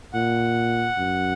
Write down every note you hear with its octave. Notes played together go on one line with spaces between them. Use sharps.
A#2 F#5
F#2